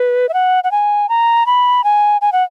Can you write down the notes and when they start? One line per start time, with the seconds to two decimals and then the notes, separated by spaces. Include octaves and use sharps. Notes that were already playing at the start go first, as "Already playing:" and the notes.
Already playing: B4
0.29 E5
0.34 F#5
0.64 F#5
0.71 G#5
1.09 A#5
1.46 B5
1.84 G#5
2.21 G#5
2.32 F#5